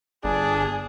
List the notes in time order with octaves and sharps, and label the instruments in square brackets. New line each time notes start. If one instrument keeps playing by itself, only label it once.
[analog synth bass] G1 [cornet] D4 [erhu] G#4